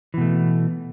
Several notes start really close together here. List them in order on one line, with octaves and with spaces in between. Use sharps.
E3 B2 A3